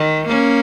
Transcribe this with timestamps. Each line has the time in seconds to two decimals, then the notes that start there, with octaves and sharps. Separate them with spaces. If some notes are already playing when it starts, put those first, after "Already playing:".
Already playing: D#3
0.28 A#3 C#4